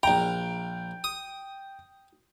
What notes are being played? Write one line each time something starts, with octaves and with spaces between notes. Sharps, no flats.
A#1 G5 A#5
D#6